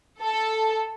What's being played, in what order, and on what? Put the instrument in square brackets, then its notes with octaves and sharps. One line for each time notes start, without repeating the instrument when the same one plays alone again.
[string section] A4